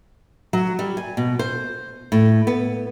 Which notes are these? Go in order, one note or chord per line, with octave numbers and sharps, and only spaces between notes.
F#3
G3
G#5
B2
C5
A2
B3